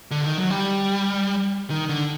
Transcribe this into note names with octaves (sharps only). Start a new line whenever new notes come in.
D3
D#3
F#3
G3
D#3
D3